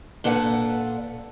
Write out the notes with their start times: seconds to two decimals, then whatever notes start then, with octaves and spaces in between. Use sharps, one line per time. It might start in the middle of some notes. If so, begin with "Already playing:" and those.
0.24 A#2 D4 A4 B4 F#5